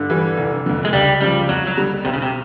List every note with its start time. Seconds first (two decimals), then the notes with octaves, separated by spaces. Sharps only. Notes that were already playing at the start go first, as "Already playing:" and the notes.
Already playing: G2 D3
0.10 E3 G3
0.38 F1
0.66 F2 D3
0.85 G#3
0.93 C#2 G3
1.21 C#3 F3 G3
1.48 F2 F#3
1.67 F#3
1.77 D3 G3
2.05 B1 C3
2.13 C#3
2.22 C3